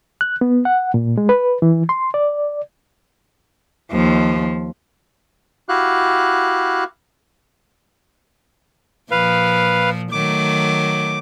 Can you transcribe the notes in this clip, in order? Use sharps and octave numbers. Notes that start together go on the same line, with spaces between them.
F#6
B3
F#5
A#2
G#3
B4
E3
C6
D5
D#2 F3
E4 F#4 G4 F5 F#6
A#2 F3 B4 F5
D#3 F#3 A3 D6